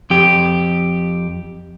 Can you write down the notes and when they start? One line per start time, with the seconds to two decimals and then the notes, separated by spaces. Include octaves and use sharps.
0.10 F2 G4